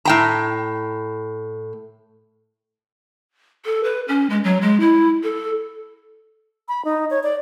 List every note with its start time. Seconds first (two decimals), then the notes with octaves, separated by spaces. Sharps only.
0.05 A2 G5 A#5
3.65 A4
3.84 B4
4.08 C#4
4.30 G#3
4.44 F#3
4.61 G#3
4.80 E4
5.23 A4
6.68 B5
6.85 D#4
7.10 C#5
7.23 D5